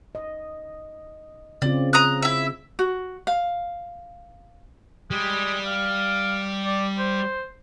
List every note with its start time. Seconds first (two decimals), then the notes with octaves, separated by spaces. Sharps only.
0.15 D#5
1.62 C#3 C4 F4 D5
1.93 A#5 D#6 F#6
2.22 E4 E5
2.79 F#4
3.27 F5
5.11 G3 G#3
5.66 F5
6.65 D5
6.98 C5